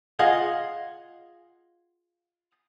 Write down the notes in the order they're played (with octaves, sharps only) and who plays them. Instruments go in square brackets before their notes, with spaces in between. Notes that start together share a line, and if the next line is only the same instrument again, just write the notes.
[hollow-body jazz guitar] F4 G#4 D#5 F5 F#5